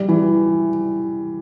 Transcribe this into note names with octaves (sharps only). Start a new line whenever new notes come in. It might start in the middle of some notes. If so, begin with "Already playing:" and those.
Already playing: G3
E3